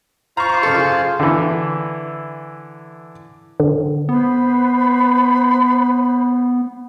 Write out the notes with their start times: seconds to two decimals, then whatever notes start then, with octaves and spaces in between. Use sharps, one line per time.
0.37 F4 C5 F5 A#5 C#6
0.49 C#6 D6
0.63 F#1 A4
0.80 G#4
1.20 D3 E3
3.60 D3
4.09 B3 B4 C5 B5